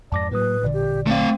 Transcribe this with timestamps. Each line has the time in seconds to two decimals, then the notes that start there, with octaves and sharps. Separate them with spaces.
0.12 F2 G#2 D5 A5 D6 A#6
0.31 A2 F#3 A3 A#3 B4 D#6
0.62 A1 G2 A#2 D3 D5
0.74 G4
1.07 D3 F#3 A3 C4 F5